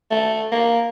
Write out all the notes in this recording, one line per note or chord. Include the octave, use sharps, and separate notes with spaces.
A3
A#3